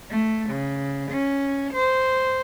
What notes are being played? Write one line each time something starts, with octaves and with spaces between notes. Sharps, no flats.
A3
C#3
C#4
C5